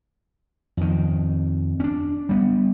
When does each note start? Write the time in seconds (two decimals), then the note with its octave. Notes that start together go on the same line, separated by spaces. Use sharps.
0.77 F2 D#3
1.80 C#4 D4
2.29 G3 B3